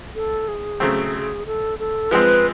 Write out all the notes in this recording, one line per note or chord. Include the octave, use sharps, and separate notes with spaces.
A4
G#4
C#3 F#3 A3 C4
A4
A4
F3 G#3 C4 B4